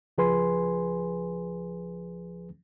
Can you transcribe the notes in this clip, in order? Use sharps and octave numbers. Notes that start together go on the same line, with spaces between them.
C#2 F3 G#4 B4 G#5 C6